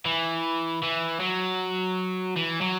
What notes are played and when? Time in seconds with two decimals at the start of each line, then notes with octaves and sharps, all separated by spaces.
0.05 E3
0.82 E3
1.20 F#3
2.37 E3
2.61 F#3